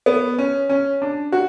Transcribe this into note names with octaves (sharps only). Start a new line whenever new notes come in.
B3
C#4
C#4
D4
F#4